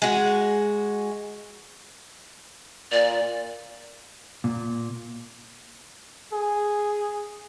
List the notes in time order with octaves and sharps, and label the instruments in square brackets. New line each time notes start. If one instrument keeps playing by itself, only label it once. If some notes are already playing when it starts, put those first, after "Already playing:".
[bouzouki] G#3 F#4
[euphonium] A#2 [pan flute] D5
[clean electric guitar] A#2
[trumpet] G#4